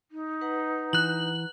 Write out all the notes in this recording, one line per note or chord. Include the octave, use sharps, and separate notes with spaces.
D#4
B4 F#5 A#5
E3 F#6 F#7